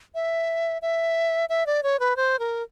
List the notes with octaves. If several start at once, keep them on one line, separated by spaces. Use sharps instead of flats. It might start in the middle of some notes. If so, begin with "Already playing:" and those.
E5
E5
E5
D5
C#5
B4
C5
A#4